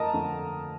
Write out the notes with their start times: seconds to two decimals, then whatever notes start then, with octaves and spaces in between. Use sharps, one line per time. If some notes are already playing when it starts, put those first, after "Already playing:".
Already playing: F2 A3 A#4 D#5 A5 A#5
0.13 F2 D3 A3